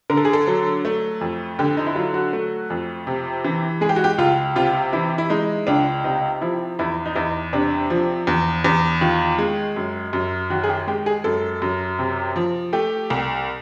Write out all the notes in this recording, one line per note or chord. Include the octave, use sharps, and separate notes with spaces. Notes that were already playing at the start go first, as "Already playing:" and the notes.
D3 A#4
A4
G#4
A4
F#3
A3
F2
D3 G4
D#4
E4
F#3 F4
F#4
A3
F2
C3
E3
G#3 G#4
G4
F#4
G4
C#2 F4
C3 F4
E3 E4
E4
G#3 D#4
C#2 D4
C3 D#4
F3 E4
E2 E4
D#4
E2 E4
C3 D4
F3
E2
E2
D#3 F4
G#3
F#2
F#2
D#3 F#4
G#4
G4
G#3 G4
G#4
F#2 A4
F#2
C3
F3
A3 G4
C2